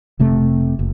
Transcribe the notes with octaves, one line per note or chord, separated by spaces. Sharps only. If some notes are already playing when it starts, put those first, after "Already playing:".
F1 C3 A3
F#1